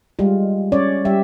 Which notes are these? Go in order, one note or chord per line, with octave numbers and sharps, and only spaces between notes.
G3 G#3 F4
C#4 C#5 D5
G3 G4 E5